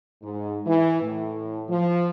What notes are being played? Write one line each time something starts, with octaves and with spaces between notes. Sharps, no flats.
G#2
E3
A2
F3